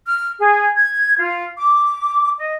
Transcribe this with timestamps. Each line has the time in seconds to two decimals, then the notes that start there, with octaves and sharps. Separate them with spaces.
0.06 F6
0.40 G#4
0.77 G#6
1.19 F4
1.58 D6
2.38 D#5